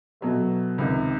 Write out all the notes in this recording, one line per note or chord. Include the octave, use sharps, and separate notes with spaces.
B2 F#3 A3
C#2 C3 D#3